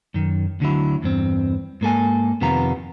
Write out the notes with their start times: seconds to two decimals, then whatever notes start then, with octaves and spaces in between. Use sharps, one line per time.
0.14 F#2 D#3
0.60 D2 D3 F#3 E4
1.02 E2 G2 C4
1.81 G#2 A#3 A4 G#5
2.41 F2 C3 D#3 B3 F4 A#5